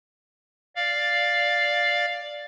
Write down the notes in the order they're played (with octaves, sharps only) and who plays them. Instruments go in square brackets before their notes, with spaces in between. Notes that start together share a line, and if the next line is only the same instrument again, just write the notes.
[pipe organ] D5 F5